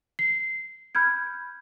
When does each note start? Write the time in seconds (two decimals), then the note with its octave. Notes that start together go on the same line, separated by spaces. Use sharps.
0.19 C7
0.95 B5 F6 G6 G#6